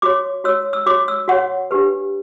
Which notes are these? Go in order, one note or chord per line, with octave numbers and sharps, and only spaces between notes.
F#4 C#5 D6
F#4 C#5 E6
E6
F#4 C#5 D6
E6
F#4 C#5 F#5
D4 G4 B4